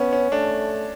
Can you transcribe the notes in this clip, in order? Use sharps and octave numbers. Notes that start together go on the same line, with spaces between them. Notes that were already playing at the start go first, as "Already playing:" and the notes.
Already playing: B3 C#4
C#4
A3 D4